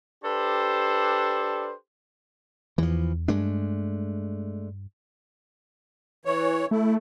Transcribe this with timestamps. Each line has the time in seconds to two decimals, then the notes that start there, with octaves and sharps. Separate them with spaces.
0.24 D4 G4 A4 B4 C5
2.78 E2 E3 F3
3.28 G2 G#3 A3 D4
6.25 E3 C#5
6.71 A3 E4